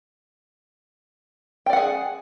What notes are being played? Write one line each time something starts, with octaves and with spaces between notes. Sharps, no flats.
G#4 D5 F#5 G5